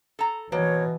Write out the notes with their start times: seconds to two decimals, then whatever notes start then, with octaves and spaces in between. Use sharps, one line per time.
0.19 A4 A#5
0.52 B2 E3 A#3 C#5